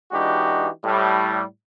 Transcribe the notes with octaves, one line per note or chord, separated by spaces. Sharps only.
E3 G#3 D4 D#4 F#4 G4
A2 G3